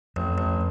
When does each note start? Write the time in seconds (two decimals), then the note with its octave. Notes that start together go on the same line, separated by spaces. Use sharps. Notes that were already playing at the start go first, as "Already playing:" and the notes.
0.16 A1 F2
0.38 A1
0.46 F2